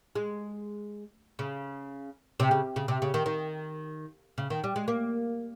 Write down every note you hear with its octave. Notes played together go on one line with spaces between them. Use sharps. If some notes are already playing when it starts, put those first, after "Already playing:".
G#3
C#3
C3
C#3
C#3
C3
C#3
D#3
D#3
C#3
D#3
G3
G#3
A#3